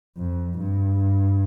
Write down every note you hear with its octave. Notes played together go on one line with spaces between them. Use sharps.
F2
G2